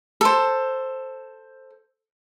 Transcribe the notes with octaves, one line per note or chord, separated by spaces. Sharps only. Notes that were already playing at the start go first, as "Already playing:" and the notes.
A4 C5